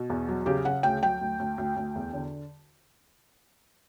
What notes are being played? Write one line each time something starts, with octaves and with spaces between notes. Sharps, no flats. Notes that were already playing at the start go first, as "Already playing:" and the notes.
Already playing: B2
E2
F#3
C#3 G4
C#3 F#5
D2 G5
F#3 G5
D2
D2
D2
D2
E2
D3